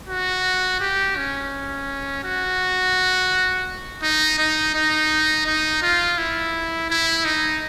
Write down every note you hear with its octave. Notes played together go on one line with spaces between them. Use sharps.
F#4
G4
C#4
F#4
D#4
D#4
D#4
D#4
F4
E4
E4
D#4